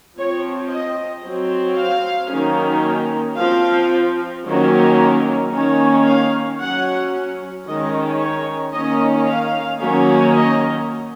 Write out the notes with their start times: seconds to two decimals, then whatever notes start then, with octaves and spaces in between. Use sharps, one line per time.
0.17 F3 C4 C#5
0.71 D#5
1.24 F#3 C4
1.77 F5
2.31 D#3 F#3 A#3 C#4
3.38 F3 C4 F5
4.46 D#3 F#3 A#3 C#4
5.53 D#3 A#3 C#4
6.06 F5
6.60 F#3 C#4 F#5
7.67 D#3 G#3 C#4 D#5
8.20 C#5
8.74 D#3 A#3 C#4 D#5
9.28 F5
9.81 D#3 F#3 A#3 C#4
10.35 D#5